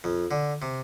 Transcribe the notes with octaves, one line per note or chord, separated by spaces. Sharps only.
F2
D3
C3